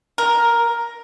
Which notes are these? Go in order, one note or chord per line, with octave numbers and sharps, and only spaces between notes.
A#4